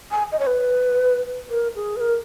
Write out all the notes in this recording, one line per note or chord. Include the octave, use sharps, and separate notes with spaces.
G#5
D#5
C#5
B4
A#4
G#4
B4
A#4